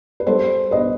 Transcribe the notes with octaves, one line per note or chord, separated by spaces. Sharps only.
B4
G3 A4 C5
B1 B4 D#5